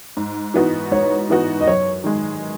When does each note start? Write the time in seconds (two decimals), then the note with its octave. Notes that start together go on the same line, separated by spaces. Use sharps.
0.17 G#2
0.54 E3 B3 D#4 F#4
0.91 G#2 C#5
1.30 E3 B3 D#4 F#4
1.61 D#5
1.67 F#2 C#5
2.04 D#3 G#3